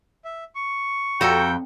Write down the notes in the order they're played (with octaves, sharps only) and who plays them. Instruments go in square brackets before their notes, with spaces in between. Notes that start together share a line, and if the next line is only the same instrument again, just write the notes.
[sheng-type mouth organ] E5
C#6
[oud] F2 [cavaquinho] F#4 A4 A#5 [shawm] G5